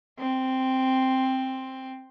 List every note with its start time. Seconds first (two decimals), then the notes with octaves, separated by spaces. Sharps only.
0.19 C4